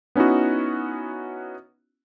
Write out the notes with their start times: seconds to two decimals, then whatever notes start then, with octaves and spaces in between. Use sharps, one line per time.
0.16 B3 C#4 D#4 E4 F#4